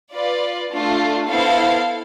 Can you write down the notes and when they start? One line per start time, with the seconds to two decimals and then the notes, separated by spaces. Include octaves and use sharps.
0.13 F4 B4 D5
0.71 A3 D4 F4
1.29 B3 E4 A4 C5 F5